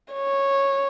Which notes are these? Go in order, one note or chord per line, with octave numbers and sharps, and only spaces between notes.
C#5